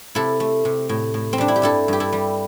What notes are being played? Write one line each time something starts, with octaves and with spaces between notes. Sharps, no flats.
C3 E4 A4
A3
C3
A2
A2
C4
G3 D4
E4
G4
G2 E4 A4
G2 G4
E4 A4
G3